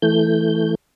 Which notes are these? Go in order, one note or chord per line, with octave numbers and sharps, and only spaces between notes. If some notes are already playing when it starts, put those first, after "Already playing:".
E3 A3 G6